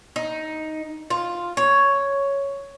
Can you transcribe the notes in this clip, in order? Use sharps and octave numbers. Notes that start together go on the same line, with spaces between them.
D#4
F4
C#5